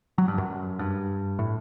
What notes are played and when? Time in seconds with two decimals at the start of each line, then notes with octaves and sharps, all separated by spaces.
0.18 F#3
0.28 G2
0.38 F#2
0.79 G2
1.39 A2